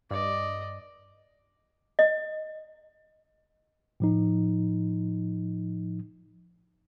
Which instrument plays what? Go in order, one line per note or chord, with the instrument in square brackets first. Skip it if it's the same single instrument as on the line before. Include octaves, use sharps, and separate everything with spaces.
[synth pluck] G2 [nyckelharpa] D5 D#5
[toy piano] D#5
[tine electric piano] A2 F3 D#4